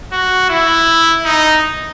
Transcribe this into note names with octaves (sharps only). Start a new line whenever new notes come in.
F#4
E4
D#4